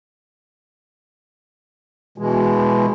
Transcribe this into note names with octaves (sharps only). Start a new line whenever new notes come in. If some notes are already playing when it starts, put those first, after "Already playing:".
B2 E3 G#3